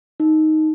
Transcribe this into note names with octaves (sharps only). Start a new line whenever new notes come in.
D#4